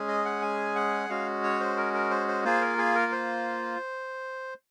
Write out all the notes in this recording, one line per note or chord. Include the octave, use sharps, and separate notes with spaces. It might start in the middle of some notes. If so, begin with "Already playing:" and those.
Already playing: G#3 C#4 G#4
D#5
F#5
G#5
F#5
G#3 C#4 F#4 F5
C#5
C5
A#4
A#4
C5
C5
A#3 F4 G#4 C5
A#4
G#4
A#4
C5